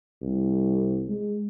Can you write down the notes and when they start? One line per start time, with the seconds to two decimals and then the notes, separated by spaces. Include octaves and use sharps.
0.22 C2
1.09 G#3